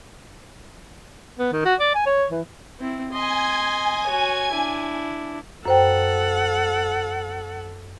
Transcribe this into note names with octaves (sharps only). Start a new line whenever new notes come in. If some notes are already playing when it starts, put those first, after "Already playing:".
B3
D#3
F#4
D5
G#5
C#5
E3
C4 E4
D#5 G#5 C6 G#6
F#4 C#5
D4 E4
F#2 A4 C5 F#5 G5